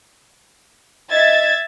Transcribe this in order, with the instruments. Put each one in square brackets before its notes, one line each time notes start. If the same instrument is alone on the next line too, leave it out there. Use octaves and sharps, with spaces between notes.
[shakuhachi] D#5 [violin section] E5 G#6 A6